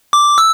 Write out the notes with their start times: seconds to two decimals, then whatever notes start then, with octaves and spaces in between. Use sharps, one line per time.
0.13 D6
0.38 E6